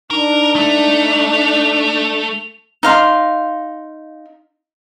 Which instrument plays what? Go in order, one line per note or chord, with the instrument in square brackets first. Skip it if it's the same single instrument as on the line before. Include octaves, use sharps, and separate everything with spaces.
[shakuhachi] D4 [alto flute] D#4 [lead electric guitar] A#4 [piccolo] F7
[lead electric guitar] A3
[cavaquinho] D#4 F5 C6